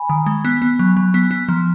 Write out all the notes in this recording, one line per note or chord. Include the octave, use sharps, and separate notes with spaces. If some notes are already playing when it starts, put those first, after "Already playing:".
Already playing: G#5 B5
D#3
G#3
B3
B3
F#3
F#3
B3
B3
F3